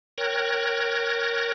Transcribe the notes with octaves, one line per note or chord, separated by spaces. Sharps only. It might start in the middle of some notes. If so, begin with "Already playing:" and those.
A#4 C#5 G5 F#6 G#6 A#6